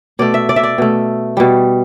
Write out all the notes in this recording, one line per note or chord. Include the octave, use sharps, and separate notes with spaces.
B2 A3 D5
E5
D5
E5
D5
B2 A3
B2 G3